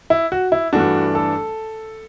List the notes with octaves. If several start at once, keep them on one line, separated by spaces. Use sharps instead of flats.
E4
F#4
E4
G2 E3 A3 D4 F#4
A4